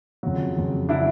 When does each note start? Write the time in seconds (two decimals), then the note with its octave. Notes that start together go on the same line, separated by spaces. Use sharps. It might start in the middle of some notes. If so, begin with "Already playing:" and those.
0.23 F2 C#3 F#3
0.56 F2 C#3 F#3
0.89 C#3 F#3 D4 E4